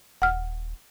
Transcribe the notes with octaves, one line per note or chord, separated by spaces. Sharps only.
D#1 F#5 F6